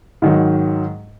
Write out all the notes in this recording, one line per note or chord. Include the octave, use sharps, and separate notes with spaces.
G#2 D#3 F#3